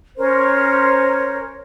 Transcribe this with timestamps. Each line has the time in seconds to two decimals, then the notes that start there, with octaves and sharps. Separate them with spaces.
0.18 C#4 A#4 C5 C#5